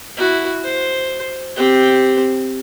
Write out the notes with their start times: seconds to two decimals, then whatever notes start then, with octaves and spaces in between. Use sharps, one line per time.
0.17 E4 F#4
0.65 C5
1.56 C4 G4